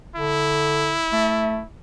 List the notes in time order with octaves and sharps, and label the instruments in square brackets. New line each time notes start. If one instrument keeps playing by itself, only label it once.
[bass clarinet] D3 [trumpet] E4
[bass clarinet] A3